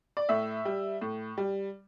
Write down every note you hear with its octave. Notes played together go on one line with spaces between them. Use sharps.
D5
A2 E5
G3
A2
G3